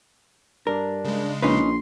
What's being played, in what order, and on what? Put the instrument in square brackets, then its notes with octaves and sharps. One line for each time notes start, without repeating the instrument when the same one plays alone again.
[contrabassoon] G2 [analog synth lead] D4 [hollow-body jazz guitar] A#4
[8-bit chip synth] C#3 G#3
[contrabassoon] A#1 [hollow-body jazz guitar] C#4 D#4 B4 [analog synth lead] C6